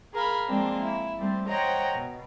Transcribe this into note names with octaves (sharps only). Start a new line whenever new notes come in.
G#4 A#4 F5 B5
F3 G#3 A#3 C4 D4
E4
G3 A3 C4
C5 C#5 D#5 F#5 G5 A#5
B2